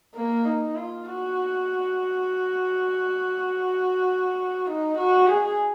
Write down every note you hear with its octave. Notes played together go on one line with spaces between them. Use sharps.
A#3
D#4
F4
F#4
D#4
F#4
G#4